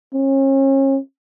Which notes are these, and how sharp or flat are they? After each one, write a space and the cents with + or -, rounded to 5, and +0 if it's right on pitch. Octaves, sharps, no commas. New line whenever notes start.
C#4 -35